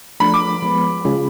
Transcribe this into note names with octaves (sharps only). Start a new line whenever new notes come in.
F3 A3 D4 B5
D6
F3 G#3 B3
C#3 G#3 C#4 F4 G#4